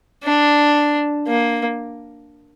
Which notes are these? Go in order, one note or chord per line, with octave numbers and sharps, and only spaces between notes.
D4
A#3